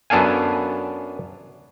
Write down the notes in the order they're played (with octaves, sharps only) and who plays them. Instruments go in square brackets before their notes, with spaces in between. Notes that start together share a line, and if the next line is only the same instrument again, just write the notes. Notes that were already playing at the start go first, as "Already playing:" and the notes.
[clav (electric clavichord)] F#2 B3 D4 A4 F5 G#5